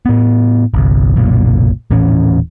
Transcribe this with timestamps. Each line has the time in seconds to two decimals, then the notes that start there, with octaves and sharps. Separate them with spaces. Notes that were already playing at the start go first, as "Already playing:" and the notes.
0.06 A2 B3
0.74 G1 C2
1.16 F#1 B1 A#2
1.90 D#1 A2 E3 C#4